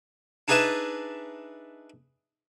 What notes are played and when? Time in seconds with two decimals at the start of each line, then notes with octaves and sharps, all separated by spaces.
0.48 D4 D#4 G#4 B4 E5 A5